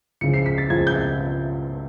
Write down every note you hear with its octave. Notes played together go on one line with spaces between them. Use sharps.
C#2 C#3 F3 C#7
C7
B6
A6
C#2 C#3 F3 G#6
G6